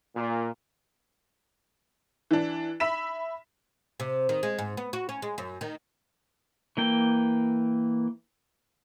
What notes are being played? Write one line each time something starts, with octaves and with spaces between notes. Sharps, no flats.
A#2
E3 D4
E5 B5 B6 E7
C3
D#3
G#3
G#2
B3
F#4
C#4
G#3
F#2
D#3
E3 A#3 G5